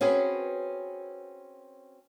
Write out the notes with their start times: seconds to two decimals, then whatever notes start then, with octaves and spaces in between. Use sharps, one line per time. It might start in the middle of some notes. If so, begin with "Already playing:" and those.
0.01 C4 C#4 F#4 G#4 B4 C#5